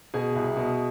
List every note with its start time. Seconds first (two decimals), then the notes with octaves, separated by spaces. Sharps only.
0.14 B2 G#4 G#5
0.36 C2
0.57 B2